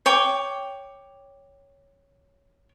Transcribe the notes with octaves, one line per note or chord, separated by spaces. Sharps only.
C#5 G5 D6